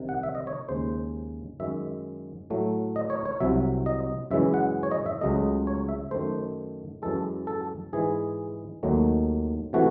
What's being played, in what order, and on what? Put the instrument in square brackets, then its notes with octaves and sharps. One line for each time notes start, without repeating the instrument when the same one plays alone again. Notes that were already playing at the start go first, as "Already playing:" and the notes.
Already playing: [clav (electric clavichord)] C2 C3 D#3
F#5
E5
D#5
C#5
D#2 C#3 G#3 C5
F#2 D#3 G#3 E5
A2 F#3 A3
D#5
C#5
C#5
C2 C3 F#3 E5
D#5
F#2 C#3 E3 G#3 E5
F#5
C#5
D#5
E5
C#2 C#3 F#3 A3 D#5
C#5
E5
F#2 D#3 A3 C5
F#2 E3 G#3 A4
A4
G#2 E3 G#3 G#4
D#2 D#3 F#3 A3
C3 E3 A3 F#4